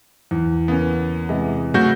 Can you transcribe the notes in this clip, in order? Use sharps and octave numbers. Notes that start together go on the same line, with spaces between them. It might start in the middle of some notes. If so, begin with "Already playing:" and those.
E2
C#3 A#3 B3 C#4
C3 E3 G#3
C#3 A3 F#4 G6